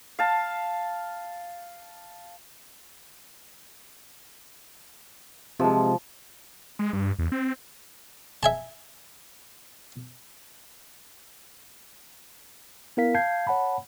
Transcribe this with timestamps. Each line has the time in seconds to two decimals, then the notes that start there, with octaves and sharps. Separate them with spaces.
0.19 F5 A5
5.60 C3 F3 G#3
6.79 G#3
6.93 G2
7.19 E2
7.32 C4
8.43 E5 G#5 A5
12.97 B3 E4 A#4 F5 B6
13.15 F5 A5 G6 G#6 C7
13.47 C#5 F#5 A5 B5